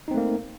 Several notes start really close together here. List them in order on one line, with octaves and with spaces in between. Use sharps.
D#4 C4 A3 A#3